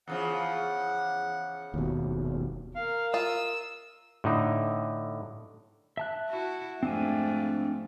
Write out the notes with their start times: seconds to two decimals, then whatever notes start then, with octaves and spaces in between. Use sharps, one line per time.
0.08 E2 C#3 F3 F#5
1.74 F1 D#2 B2
2.76 A#4 F5
3.14 F4 D#6 E6
4.24 A2 D3 D#4
5.97 E5 A5 F#6
6.29 E4 F#4
6.83 F2 G#2 A3 C4 D4 G#5